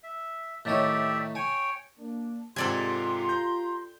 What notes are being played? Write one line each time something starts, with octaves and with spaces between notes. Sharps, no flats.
E5
A2 D#3 G4 C#5 D5 E5
C#5 G5 G#5
A#3 D4
G#2 C3 F4 G4 A4 D5 G#5 C6
A#5 G6